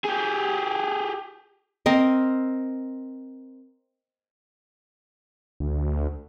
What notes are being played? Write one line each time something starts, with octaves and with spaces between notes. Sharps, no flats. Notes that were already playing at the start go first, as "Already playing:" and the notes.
G4 G#4
C4 A#4 D#5
D2